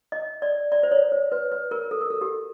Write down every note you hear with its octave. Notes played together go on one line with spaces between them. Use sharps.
D#5
D5
D5
C5
C#5
C5
B4
B4
A#4
A4
A#4
A4
G4